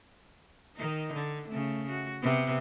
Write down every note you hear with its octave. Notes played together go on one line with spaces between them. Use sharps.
D#3 D#4
D3
C#3 A3
F#4
C3 B3 C4